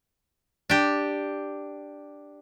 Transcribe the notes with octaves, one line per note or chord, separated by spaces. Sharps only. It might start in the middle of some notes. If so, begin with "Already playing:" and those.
D4 G4